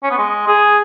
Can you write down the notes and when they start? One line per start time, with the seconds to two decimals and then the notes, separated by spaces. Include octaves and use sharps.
0.03 C#4
0.10 B3
0.18 G#3
0.47 G#4